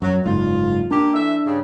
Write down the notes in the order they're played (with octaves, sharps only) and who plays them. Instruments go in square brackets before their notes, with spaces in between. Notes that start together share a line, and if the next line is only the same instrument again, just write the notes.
[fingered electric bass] F#2 [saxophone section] F#3
[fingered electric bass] F#1 G#2 [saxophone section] F4
[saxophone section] A#3 G4 [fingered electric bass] D4
[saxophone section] E3 A3 E5
G2 C#3